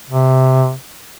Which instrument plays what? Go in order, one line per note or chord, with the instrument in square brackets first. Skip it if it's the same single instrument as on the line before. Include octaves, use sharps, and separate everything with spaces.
[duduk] C3